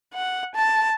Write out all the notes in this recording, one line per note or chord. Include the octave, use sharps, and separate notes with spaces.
F#5
A5